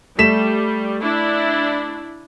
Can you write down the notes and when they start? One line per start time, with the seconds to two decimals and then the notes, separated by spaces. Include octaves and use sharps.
0.18 G3 A3 B6 E7
0.99 D4 E4